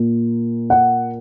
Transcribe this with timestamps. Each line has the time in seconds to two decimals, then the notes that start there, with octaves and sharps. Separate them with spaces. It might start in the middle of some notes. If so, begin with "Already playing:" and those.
Already playing: A#2 A#3
0.70 F#5